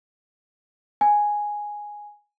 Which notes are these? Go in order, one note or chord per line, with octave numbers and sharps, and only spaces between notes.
G#5